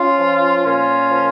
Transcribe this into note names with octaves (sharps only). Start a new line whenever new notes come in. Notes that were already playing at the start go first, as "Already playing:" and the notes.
Already playing: C#4 F4
F3
A#2 C#4 F4
F3